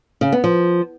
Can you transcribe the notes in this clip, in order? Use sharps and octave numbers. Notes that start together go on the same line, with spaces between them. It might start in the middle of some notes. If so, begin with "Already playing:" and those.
C#3
B3
F3